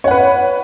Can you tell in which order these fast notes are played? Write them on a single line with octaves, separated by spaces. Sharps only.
C#5 F#5 B4